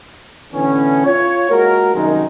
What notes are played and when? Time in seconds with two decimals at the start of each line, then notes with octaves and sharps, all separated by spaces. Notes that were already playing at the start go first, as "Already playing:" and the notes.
0.54 A2 D3 E3 B3 C#4
1.06 F4 C#5
1.50 G#3 A#3 F#4 A#4
1.94 C2 F#2 D#3 F#3 G#3 D#4